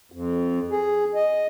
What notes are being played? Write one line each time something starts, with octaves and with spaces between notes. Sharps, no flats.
F2
G#4
D#5